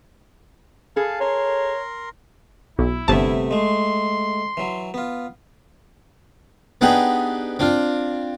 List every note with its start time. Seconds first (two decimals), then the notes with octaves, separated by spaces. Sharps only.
0.96 G#4 A4 F5 A5
1.20 A#4 C#5 A#5 C6
2.79 B1 E4
3.08 G1 C3 A3 B3 A5
3.51 G#3 A3 C6
4.57 E3 F#3
4.94 B3 F4
6.81 B3 D4 D#4 G4 G#4 B4
7.59 C4 D4 F4